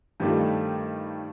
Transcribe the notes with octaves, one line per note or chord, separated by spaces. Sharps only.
G2 D#3 F3 G3 A3